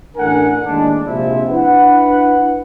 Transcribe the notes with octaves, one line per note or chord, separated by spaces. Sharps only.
A1 D4 A4 A#4 F#5 G#5
D#2 A2 G#3 D4
A#1 C3 F3 G#3 E4 E5
D4 E4 B4 F#5